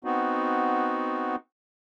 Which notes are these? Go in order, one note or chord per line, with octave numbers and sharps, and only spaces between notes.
B3 C4 D#4 F#4